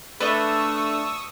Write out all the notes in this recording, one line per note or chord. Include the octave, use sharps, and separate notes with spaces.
A3 D4 B4 D#5 C#6 D#6 E6